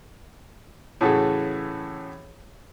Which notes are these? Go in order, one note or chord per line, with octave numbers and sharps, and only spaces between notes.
A2 C#3 E3 F#4 G#4 A4